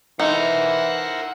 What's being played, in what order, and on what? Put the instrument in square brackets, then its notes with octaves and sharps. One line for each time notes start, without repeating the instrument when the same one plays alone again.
[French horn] E3 [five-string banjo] D#4 [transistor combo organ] E4 A#4 C5 [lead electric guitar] F#5 C6